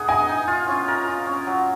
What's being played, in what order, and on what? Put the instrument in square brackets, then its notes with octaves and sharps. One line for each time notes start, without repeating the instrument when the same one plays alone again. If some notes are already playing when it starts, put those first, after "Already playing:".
Already playing: [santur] D#4 G#4 [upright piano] F#5
[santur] D#5 [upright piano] G#5
[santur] D#4
F4
C#4
A#4
F4
C#4
F#3